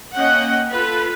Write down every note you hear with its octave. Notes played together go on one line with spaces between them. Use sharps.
A#3 C#4 D#5 F#5 G5
F4 A4 B4